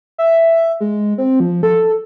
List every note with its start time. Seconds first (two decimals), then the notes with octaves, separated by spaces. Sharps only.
0.18 E5
0.80 G#3
1.18 C4
1.40 F3
1.63 A4